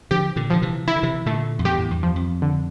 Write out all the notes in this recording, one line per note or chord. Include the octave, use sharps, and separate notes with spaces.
D3 F3 G4
A#2 D3
D3 F3
C3 E3
E3 E4
D3
C3 E3
A#2 D3 A3
F2
E2 G2 G4
A2
E2 G2
F3
F2
D3